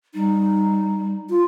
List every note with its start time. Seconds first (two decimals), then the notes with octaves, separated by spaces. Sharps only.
0.14 G3 D#4
1.30 F4